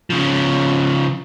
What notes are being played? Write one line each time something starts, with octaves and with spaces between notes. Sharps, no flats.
C#3 F3